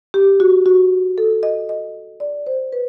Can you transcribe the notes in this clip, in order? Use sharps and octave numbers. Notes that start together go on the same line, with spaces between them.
G4
F#4
F#4
A4
D#5
D#5
D5
C5
B4